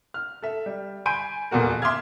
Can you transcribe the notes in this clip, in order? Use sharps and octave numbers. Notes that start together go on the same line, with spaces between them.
F6
A4 E5
G3
G#5 B5 C6 G6 D7 D#7
D#1 E2 A#2 B3 F#4 A#4
E5 C6 D6 D#6 F6 G#6